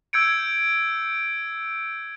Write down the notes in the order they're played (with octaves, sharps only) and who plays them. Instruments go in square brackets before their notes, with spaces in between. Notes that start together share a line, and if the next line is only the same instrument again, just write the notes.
[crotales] E6 G6 G#6 C#7 D7